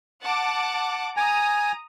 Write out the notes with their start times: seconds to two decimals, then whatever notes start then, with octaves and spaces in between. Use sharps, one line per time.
0.22 F#5 A5 D6
1.17 G#5 A#5 D#6